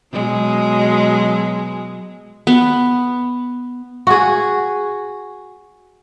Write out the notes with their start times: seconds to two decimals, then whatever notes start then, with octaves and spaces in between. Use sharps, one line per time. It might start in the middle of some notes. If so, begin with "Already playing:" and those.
0.12 B2 F#3 G#3
2.47 B3
4.07 F#4 G#4